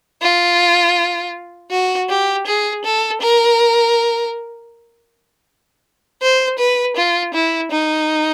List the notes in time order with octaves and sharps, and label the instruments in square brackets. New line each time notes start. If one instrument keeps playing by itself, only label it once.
[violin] F4
F#4
G4
G#4
A4
A#4
C5
B4
F4
E4
D#4